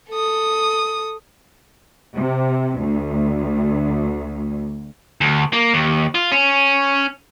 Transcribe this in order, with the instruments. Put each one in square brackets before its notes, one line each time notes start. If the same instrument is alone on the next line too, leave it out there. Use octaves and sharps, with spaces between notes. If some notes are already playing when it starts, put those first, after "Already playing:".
[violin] A4 D#6
[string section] C3
D2
[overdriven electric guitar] D2
A#3
D#2
F4
C#4